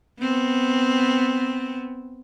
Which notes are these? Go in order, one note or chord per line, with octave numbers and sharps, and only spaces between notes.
B3 C4